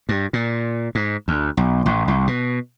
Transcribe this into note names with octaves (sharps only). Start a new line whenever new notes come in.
G2
A#2
G#2
D2
B1
A1
C2
B2